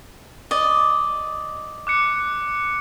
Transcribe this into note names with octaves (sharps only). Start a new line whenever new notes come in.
D5 D#5
D6 F#6 C#7